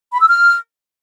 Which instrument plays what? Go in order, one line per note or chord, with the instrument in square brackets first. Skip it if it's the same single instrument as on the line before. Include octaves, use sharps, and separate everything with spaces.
[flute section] B5
E6
F6